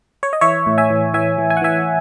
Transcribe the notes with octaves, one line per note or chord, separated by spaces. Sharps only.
C#5
D#5
E3 C#5 E5
A2
E5 G#5
E3
E3 E5 G#5
E3
G#5
F#5
E3 E5 G#5